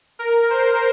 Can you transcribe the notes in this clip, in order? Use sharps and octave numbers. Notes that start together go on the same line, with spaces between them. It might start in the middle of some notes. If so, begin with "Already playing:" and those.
A#4
C5